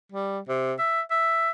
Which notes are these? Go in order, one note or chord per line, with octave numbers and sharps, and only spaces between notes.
G3
C3
E5
E5